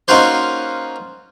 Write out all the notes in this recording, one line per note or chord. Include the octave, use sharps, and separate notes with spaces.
A#3 C#4 D#4 F4 F#4 C5